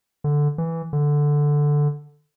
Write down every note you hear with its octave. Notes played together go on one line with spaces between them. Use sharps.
D3
E3
D3